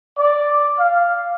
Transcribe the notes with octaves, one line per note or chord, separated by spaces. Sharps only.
D5
F5